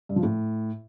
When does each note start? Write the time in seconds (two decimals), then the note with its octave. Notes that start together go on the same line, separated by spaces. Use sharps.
0.09 G2
0.16 F3
0.23 A2